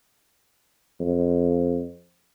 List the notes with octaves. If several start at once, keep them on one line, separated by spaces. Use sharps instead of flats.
F2